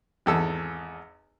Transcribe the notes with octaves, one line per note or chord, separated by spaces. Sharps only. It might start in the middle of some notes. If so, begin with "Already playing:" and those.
G#1 E2 A4 E6